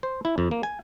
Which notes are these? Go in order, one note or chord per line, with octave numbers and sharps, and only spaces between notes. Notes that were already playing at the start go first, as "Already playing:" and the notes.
C5
E4
F2
A#3
G#5